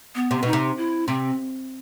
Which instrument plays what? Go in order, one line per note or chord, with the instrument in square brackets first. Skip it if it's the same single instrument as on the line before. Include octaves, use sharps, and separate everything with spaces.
[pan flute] B3
[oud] C3
[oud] B2 [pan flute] D#4
[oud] C3
[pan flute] E4
[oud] C3 [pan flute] C4